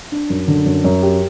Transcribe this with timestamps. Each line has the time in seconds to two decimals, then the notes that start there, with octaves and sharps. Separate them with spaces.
0.12 D4
0.30 F#2
0.48 D3
0.66 F#2
0.84 F#2
1.03 G4